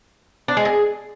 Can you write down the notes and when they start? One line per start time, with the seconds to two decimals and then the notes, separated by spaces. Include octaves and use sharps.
0.48 D4
0.57 G#3
0.65 G#4